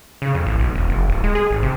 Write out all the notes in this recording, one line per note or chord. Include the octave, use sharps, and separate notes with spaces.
C#3
F2
A1
B1
E1
F#1
D1
G#3
G#4
G#1
C3